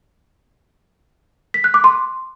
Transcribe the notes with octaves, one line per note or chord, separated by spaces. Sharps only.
B6
F#6
D6
C6